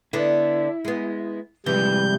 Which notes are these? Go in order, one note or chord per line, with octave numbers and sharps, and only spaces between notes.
D3 B3 D4 E4
G#3 B3
C3 E3 F3 G3 G#3 G6